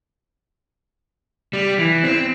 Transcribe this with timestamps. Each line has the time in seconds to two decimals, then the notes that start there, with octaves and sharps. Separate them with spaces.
1.53 G3
1.78 E3
2.04 C4